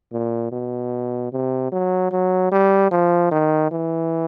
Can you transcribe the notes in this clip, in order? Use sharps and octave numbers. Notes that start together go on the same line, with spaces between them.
A#2
B2
C3
F#3
F#3
G3
F3
D#3
E3